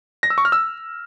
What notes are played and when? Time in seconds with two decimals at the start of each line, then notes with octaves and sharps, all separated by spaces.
0.23 A#6
0.30 E6
0.38 C#6
0.45 F6
0.52 E6